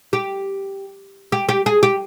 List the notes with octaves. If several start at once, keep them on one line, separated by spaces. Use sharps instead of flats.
G4
G4
G4
G#4
G4